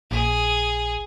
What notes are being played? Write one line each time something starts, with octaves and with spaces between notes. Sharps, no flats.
A#1 G#4